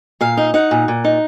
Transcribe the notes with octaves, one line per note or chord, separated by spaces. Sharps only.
A#2 F5
D#4
D#4 F#5
A#2
A#2
D#4